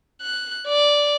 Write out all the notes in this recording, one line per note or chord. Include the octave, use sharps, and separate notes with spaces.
F#6
D5